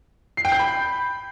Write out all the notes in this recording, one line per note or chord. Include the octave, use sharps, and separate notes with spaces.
C7
G5
G6
B5